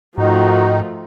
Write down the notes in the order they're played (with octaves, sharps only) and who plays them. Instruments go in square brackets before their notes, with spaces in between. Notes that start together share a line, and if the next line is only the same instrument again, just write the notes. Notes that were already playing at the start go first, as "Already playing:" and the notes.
[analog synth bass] G#2 [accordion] D#3 D#4 [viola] F3 A3 [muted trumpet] F#4